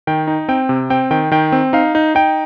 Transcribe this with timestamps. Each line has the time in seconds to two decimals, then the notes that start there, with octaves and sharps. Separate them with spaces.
0.07 D#3 G5
0.27 D#4
0.48 C4 G5
0.69 C3
0.90 C4 G5
1.11 D#3 G5
1.32 D#3 G5
1.52 C4
1.73 D#4 F5
1.95 D#4
2.15 D#4 G5